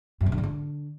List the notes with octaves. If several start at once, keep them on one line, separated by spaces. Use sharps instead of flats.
F#2
B2
D3
G#2
D3